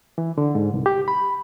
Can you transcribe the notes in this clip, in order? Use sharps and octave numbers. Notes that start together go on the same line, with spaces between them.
E3
D3
G#2
C2
G4
B5